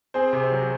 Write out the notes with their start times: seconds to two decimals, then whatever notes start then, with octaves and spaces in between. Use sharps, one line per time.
0.14 C4 G#4 C5
0.33 C3
0.52 F#3